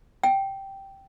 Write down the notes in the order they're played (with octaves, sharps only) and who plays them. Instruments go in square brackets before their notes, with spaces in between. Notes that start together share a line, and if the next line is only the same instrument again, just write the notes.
[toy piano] G5